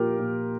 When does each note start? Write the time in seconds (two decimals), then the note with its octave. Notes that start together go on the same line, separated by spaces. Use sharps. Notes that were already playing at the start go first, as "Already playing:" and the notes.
Already playing: A#2 F3 A#3 F4 G4 A#4
0.19 A#2